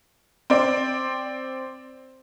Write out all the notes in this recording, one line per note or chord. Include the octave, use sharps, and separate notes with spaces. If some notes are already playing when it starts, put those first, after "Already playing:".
C4 D5